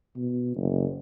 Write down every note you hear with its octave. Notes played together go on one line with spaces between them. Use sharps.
B2
F#1